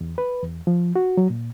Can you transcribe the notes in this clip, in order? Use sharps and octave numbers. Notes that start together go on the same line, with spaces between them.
E2
B4
E2
F3
F#4
F#3
A#2